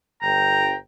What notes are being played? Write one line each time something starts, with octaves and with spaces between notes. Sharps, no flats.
G1 G5 A#5